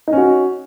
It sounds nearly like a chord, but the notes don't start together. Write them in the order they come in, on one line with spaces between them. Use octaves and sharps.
D#4 C#4 F#4